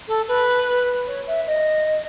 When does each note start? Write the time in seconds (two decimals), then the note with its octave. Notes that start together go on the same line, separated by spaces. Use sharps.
0.08 A4
0.28 B4
1.07 C#5
1.27 E5
1.47 D#5